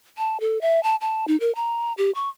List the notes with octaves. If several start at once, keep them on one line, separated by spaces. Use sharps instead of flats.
A5
A4
E5
A5
A5
D#4
A#4
A#5
G4
C#6